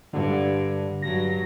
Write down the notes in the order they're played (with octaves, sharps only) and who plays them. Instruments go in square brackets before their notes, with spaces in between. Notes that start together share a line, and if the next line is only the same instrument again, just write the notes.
[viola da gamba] G2 [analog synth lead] D3
[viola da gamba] G2 F#3 [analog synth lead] A#6